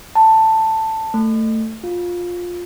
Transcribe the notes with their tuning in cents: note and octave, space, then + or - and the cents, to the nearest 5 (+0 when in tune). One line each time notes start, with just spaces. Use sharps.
A5 +10
A3 +15
F4 +15